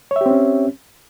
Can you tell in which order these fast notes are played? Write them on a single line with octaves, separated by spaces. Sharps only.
C#5 E5 G4 C4 C#4